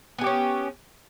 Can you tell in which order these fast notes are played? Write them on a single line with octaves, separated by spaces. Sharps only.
B3 G#4 G4 C#4